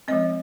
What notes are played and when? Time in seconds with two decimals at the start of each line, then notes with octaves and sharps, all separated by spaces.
0.08 F3 G#3 C4 D#5